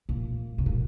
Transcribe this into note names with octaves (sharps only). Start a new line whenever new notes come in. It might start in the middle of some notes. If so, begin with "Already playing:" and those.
A#2
C3
A#2